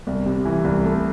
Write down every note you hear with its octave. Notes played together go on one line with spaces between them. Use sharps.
C2
C3
E3
C2
A3